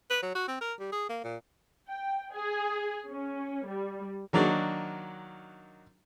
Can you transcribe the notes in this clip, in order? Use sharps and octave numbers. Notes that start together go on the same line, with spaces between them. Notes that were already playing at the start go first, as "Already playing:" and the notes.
B4
F#3
F#4
C4
A#4
G3
G#4
A#3
A#2
G5
G#4
C#4
G3
D#3 F#3 A#3 D4 D#4 F#4